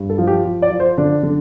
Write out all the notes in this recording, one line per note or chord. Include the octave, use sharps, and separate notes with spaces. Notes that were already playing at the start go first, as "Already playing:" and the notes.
Already playing: G2
A4
F3
G4
F3
D5
F3
C5
D3 D4
D3